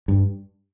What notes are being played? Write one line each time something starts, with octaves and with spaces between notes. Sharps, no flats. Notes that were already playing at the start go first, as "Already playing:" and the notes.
G2